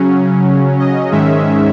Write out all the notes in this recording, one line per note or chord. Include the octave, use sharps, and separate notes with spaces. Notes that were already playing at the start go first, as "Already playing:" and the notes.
Already playing: C#3 F#3 C#4
D#5
G#2 D#3 G#3 C#4 E5